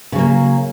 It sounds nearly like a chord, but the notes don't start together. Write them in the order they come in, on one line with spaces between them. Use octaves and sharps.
C#3 F#3 A#3